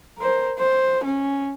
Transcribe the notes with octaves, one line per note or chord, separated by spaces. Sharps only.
A#4 C5
C5
C#4